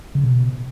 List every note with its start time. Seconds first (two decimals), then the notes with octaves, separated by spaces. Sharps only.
0.15 C#3
0.24 B2